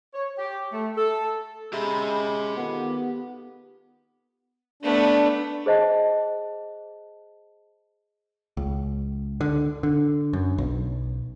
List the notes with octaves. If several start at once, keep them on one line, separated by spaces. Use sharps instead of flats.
C#5
G4
A3
A4
G#3 C#4 G4 E5 B5
D#3 B3 F4 A4
A3 B3 D4
G#4 C5 D#5 A5
C#2
D3
D3
F#2
B1